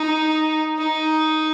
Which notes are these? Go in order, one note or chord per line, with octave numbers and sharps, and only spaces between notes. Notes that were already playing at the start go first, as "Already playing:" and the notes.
Already playing: D#4
D#4